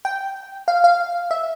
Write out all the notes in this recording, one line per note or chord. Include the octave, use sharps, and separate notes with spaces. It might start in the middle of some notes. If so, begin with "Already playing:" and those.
G5
F5
F5
E5